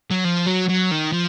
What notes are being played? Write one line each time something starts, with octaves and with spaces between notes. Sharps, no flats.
F#3
F3
F#3
F#3
D#3
F3